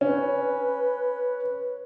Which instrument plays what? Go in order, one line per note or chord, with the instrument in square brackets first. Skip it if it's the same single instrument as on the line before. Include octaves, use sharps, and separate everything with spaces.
[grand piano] C#4 [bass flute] B4